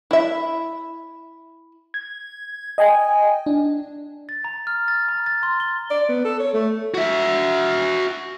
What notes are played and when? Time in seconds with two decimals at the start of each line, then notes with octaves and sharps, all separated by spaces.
0.11 E4 E5
1.94 G#6
2.78 D#5 G5 G#5
3.46 D4
4.29 A6
4.44 A#5
4.67 F6
4.88 A6
5.08 A#5
5.26 A6
5.43 C6
5.60 G7
5.90 D5
6.09 B3
6.25 A4
6.39 C#5
6.53 A3
6.94 F#4 E5